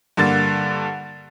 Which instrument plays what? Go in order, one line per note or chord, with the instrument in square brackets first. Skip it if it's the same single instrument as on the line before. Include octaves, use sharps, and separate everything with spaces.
[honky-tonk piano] G2 D3 A#3 A6